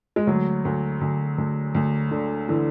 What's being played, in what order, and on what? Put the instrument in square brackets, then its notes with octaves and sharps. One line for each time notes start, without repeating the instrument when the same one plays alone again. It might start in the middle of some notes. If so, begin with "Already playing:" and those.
[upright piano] G#3
D2 F#3
D2
D2
D2
D2
D3
D3 E3